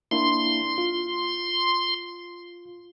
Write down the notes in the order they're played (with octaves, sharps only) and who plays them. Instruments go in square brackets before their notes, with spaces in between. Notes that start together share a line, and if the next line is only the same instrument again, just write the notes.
[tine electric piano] A#3 D4 E4 [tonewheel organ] C6
[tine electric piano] F4